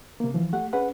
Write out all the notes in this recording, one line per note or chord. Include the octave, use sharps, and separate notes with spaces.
C3 A#3
E3 F3
A3 G4 F#5
C#4 G#4 B4 F#5